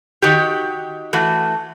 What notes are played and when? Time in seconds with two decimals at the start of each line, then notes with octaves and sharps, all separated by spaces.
0.22 D#3 F#4 G4
1.13 E3 A3 F#4